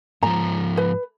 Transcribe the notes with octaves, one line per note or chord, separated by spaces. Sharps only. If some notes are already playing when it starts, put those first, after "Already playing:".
G#2 F3 A#5
B4